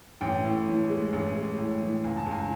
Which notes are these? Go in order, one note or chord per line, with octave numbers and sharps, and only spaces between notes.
A1 G5
A2
E3
G#3
A1
G#3
A2
E3
C#2 G#5
A5
C#2
G#5